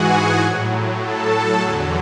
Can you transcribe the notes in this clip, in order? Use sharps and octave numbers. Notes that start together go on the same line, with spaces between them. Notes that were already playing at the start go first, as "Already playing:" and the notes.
Already playing: G#2 E3 F#4 G#4 F#5 G#5
A2 F#3
A4 A5
E2 D3 F#3 G#4 G#5